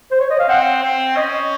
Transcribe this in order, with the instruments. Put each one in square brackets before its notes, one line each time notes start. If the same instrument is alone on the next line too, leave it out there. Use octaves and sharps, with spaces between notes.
[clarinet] C5
C#5
D#5
F5
[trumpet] C4 [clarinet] F#5
[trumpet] C4
[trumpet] C#4 [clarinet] D#5